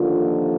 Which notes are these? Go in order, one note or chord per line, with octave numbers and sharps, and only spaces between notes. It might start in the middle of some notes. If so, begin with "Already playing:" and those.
Already playing: D#2 D3 F3 A#3 F4